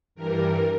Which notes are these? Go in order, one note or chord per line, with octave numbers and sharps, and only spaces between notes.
G2 E3 G3 A#4